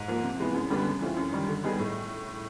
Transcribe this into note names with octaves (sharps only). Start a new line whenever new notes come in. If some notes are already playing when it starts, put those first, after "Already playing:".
Already playing: G#2
F3 A#3
C3
E3 G#3 B3
F#2
D3 G3 B3 D4
C#3
E3 A3 C4 F4
F#2
D#3 G3
D3
G3 B3 D#4 G#4
A2